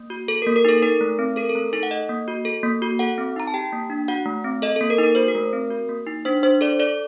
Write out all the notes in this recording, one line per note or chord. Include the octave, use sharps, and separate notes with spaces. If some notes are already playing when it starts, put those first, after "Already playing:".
Already playing: A#3
F#4
A4
A#4
A#3
A#4
D#4 A4
D#4 A#4
A3
C4
A4 A#4
A4
A3
D#4 A4
F#5
A4 D#5
A#3
F#4
A4
A#3
F#4
A4 F#5
C4
D#4 A#5
A5
G4 G5
A#3
D4
F#4 F#5
A3
C4
A4 D#5
A4
A#3
A#4
D#4
A#4
F#4 C5
A#4
A3
C4
F#4
A#3
D#4
D4 C5
D4 C5
A4 D5
A4 D5